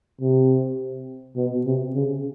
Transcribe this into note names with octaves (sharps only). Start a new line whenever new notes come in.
C3
B2
C3
C#3